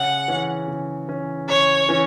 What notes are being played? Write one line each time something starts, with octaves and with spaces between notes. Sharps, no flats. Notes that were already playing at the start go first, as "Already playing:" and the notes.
Already playing: C#3 F#5
E3 C#4
C#3
E3 C#4
C#3 C#5
E3 C#4